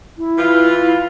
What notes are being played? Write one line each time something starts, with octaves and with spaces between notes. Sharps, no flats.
E4
E3 F4